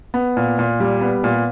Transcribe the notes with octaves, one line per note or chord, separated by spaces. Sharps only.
B3
A#2
A#2
G3
B3
A#2